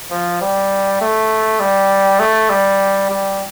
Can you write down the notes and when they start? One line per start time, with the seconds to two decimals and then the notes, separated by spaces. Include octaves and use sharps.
0.11 F3
0.41 G3
1.01 A3
1.60 G3
2.19 A3
2.50 G3
3.10 G3